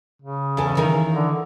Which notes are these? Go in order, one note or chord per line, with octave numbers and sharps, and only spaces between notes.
C#3
E2 A4 G#5
D#3 E3 D#4
D3